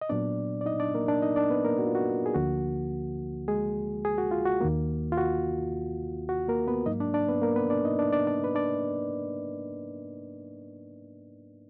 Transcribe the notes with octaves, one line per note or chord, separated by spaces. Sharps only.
D#5
A#2 F#3 B3 D4 D5
D5
D#4 D#5
D4 D5
A#3 A#4
D4 D5
D#4 D#5
D4 D5
B3 B4
A#3 A#4
F#4
F4
F#4
G#4
D2 D3 F3 A#3 F#4
G#3 G#4
G#4
F#4
F4
F#4
D#2 D#3 A#3
F4
F#4
F#4
A#3 A#4
B3 B4
G#2 F#3 A#3 D#4 D#5
D4 D5
D4 D5
B3 B4
A#3 A#4
B3 B4
D4 D5
D#4 D#5
D4 D5
D4 D5
D4 D5
B4
D4 D5